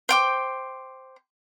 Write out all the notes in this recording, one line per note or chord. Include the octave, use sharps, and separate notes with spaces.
C5 G5 D6